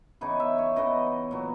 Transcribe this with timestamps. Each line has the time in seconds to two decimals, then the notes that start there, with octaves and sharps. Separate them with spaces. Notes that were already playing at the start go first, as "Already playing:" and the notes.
0.21 C#3 E3 B3 D#4 G#5
0.40 E5
0.58 C#5
0.76 C#3 E3 B3 D#4 D#5
1.31 A#2 F#3 B3